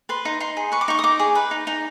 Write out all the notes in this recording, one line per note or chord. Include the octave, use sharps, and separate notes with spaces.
B4 C6
D#4
D#4 C6
G#4
B4 C#6
D6
D#4 C#6
D#6
D#4 D6
G#4
B4
D#4
D#4